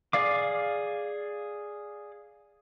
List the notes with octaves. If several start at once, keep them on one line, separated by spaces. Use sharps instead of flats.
G#4 D5 F5 D6